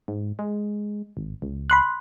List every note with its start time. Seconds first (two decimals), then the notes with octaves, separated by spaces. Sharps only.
0.08 G#2
0.39 G#3
1.17 G#1
1.42 C#2
1.70 B5 C6 F#6